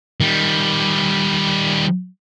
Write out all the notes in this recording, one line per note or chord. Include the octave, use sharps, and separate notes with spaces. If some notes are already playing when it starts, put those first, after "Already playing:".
D#3 G3